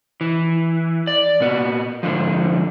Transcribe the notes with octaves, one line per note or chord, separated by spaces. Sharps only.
E3
D5
A#2 B3
G#2 B2 D3 F3